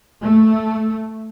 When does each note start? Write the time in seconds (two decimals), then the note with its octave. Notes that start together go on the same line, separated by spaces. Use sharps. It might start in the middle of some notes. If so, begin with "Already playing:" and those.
0.23 A3